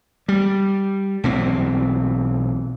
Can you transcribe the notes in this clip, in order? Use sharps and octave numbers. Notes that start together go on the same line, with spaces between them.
G3
B1 E3 C4